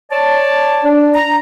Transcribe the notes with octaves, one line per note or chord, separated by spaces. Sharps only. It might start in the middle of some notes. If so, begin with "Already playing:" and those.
C#5 D5 A5
D4
A#5